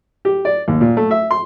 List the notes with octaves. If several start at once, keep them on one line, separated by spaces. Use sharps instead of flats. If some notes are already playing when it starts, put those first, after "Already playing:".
G4
D5
D#2
A#2
A3
E5
C6